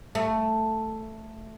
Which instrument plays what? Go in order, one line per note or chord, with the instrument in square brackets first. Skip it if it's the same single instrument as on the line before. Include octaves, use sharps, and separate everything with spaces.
[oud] A3